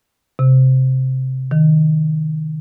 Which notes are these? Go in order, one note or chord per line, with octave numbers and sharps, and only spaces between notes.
C3
D#3